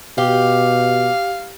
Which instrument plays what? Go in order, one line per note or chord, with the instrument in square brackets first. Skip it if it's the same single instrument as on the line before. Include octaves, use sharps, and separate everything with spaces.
[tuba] B2 [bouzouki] G4 [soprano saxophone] F5